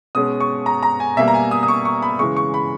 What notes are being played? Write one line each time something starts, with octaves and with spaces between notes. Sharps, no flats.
B2 G#3 C#4 D#6
C#6
A#5
A#5
G#5
B2 G3 A#3 E5
A#5
G#5
D#6
D#6
C#6
C#6
B5
C#3 E3 G#3 C#6
C#6
B5